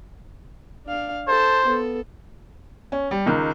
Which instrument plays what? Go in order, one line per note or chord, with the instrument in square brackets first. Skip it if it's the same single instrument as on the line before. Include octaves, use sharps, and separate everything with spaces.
[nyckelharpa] D4 F5
[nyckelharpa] A4 A5 [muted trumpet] C5
[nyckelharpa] B3 A4
[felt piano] C#4
G3
C#2 D#3